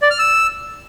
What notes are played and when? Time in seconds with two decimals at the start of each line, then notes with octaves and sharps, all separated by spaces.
0.02 D5
0.11 F6
0.19 E6